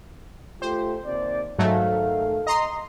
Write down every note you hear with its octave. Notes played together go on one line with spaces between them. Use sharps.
A3 F4 G4 C5
D#2 C3 D5
G#2 D#3 F#3 A3 A4 F5
D#5 A#5 C6